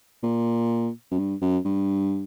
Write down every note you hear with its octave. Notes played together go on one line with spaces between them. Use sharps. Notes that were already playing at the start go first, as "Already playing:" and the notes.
A#2
F#2
G2
F#2
G2